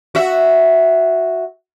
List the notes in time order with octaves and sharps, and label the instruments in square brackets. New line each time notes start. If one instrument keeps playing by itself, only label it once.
[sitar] F#4 E5